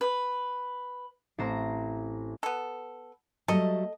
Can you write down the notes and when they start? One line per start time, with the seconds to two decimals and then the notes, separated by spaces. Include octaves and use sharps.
0.01 B4
1.38 A1 C4 C5 A#5
2.43 B3 A4
3.48 F#3 G3 A3 A4 D#5